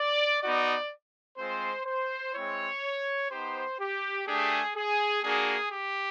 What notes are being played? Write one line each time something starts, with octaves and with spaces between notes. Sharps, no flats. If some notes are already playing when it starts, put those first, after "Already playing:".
Already playing: D5
B3 D#4 F#4 D5
G#3 C4 F4 C5
C5
G#3 C4 E4 C#5
B3 D#4 G4 C5
G4
A3 D4 G4 G#4
G#4
A#3 D4 F#4 G#4
G4